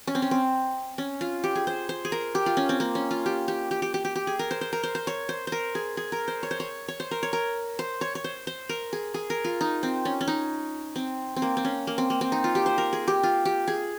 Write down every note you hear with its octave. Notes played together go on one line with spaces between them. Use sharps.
C#4
C4
C#4
C4
C#4
F4
G4
G#4
C5
C5
G#4
A#4
G4
F4
C#4
C4
A#3
C#4
F4
G4
G4
G4
G4
G4
G4
G4
G#4
A#4
C5
C5
A#4
C5
C5
C#5
C5
A#4 C5
G#4
G#4
A#4
C5
C#5
C5
C#5
C#5
C5
A#4
C#5
A#4
C5
C#5
C#5
C5
C5
A#4
G#4
G#4
A#4
F4
D#4
C4
C#4
C#4
D#4
C4
C4
A#3
C4
C#4
A#3
C4
A#3
C4
D#4
F4
G4
C5
A#4
G#4
G4
F4
G4
G#4